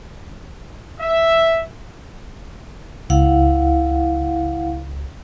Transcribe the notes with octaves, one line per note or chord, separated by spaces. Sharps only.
E5
C#2 E4 F5 F#5